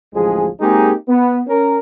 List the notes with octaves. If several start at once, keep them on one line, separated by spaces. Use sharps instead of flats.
A1 D2 F3 G#3 G#4
G#3 A#3 C4 D#4 G4 G#4
B3
C#4 A#4